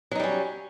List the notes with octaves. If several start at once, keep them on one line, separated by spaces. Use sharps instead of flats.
F#3 G3 C#4 D#4